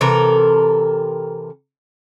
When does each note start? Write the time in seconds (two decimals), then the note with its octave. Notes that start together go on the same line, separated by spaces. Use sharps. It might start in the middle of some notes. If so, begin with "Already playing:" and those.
0.01 C3 E3 A4 A#4